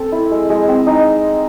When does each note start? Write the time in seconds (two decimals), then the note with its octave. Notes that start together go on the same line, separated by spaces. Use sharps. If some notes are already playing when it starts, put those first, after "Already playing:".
Already playing: C4 A4
0.12 E4
0.31 G#3
0.49 G#3
0.68 C4
0.87 D#4